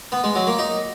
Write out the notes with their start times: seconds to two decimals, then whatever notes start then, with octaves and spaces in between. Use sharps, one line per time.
0.12 B3
0.24 G#3
0.35 F#3
0.47 A#3
0.59 D#4